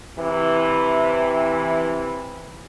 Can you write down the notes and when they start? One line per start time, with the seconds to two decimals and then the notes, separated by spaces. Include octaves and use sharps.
0.18 C3 E3